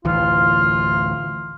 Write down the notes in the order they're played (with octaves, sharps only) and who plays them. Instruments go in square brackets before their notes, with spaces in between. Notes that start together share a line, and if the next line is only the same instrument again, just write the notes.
[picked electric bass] A1 D2 E3 [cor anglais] F4